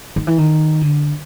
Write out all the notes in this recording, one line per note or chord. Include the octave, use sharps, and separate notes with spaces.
D#3
E3
D#3
D3